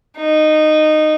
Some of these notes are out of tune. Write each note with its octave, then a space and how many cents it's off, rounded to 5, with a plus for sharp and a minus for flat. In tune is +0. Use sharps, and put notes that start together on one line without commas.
D#4 -15